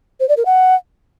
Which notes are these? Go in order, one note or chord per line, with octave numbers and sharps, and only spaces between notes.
C5
D5
A#4
F#5